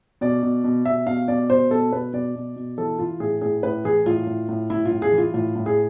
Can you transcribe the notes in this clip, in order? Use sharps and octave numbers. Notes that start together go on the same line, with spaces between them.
B2 D5
B2
B2
B2 E5
B2 F5
B2 D5
B2 C5
B2 A4
B2 B4
B2 D5
B2
B2
E3 A4
E3 F4
A2 G#4
A2 G#4
A2 B4
E3 G#4
A2 F4
A2
A2
A2 E4
F4
A2
G#4
E3
F4
A2 F4
A2
G#4